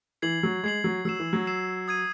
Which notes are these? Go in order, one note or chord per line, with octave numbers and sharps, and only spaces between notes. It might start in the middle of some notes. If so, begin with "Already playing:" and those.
E3 G#6 C7 F#7
F#3
G#3 G#6 C7 F#7
F#3
F#3 E6 C7 E7
E3
F#3
E6 C7 E7
D#6 G#6 D#7